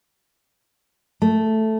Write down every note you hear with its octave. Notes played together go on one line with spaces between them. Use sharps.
A3